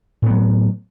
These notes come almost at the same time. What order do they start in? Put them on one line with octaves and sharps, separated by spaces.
A2 B3 F#3